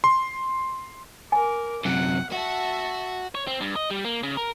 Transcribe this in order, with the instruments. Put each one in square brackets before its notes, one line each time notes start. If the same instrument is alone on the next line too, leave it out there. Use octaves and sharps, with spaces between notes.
[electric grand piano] C6
[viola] A#4 D6 [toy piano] G#5
[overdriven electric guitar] F#2 C3 [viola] F#5
[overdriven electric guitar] F#4 [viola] E5 A5
[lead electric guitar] C#5
C4
G2
D#5
G3
A#3
C#3
A#4